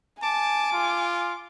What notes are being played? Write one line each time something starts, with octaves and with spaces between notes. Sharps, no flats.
G#5 A5 D6
F4